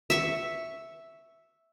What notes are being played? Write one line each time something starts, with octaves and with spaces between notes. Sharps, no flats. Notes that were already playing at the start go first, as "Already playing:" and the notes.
E5 C#6